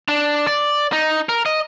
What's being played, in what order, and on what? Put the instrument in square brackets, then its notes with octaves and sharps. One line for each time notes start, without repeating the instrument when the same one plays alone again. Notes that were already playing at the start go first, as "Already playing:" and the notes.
[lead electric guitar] D4
D5
D#4
A#4
D#5